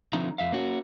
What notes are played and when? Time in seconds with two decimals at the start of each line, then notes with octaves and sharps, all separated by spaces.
0.13 D3 F3 C4 D#4 E5 A#5
0.38 F2 E5 F5
0.52 A#3 C#4 F#4